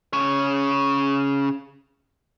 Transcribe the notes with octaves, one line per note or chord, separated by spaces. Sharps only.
C#3 C#5